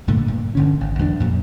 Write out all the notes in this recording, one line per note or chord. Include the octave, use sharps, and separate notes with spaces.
G2 A#2 D3 A3
G2 A#2
G1 D3 C#4
G#1
E2 F#3 B3 D4
F2 A#2 F#3